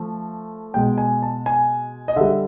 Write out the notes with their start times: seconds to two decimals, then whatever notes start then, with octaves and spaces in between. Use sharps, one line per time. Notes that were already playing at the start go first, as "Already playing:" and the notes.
Already playing: F3 A3
0.74 B2 G#3 G5
0.98 G#5
1.22 A5
1.46 G#5
2.08 D#5
2.16 D3 G3 E5